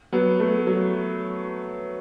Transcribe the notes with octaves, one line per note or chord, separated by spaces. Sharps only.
F#3 B3
A3
F#3